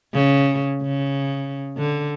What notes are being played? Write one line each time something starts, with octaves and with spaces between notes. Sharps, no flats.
C#3
C#3
D3